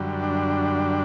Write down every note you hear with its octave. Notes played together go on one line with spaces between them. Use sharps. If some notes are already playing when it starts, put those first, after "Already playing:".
Already playing: F#2 D3 G3
D4